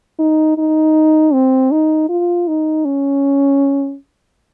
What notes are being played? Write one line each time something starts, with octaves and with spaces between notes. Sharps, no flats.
D#4
D#4
C4
D#4
F4
D#4
C#4